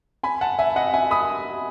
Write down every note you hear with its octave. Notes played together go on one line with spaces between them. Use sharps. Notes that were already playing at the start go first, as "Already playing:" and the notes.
G#5 B5
F#5 A5
E5 G#5
D#5 F#5
E5 G#5
B5 D#6